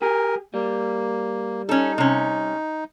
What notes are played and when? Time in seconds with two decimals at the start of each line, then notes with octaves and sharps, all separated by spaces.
0.02 G4 G#4 A#4
0.54 G3 A#3
1.69 C#4 D#4 A4
1.98 C3 C#4